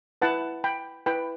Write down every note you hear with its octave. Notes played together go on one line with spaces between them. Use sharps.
E4 B4 F#5 A5
G5 B5
E4 B4 G5 B5